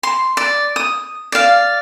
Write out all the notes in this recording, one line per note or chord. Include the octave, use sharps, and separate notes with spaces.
C6
D5
D#6
D5 F5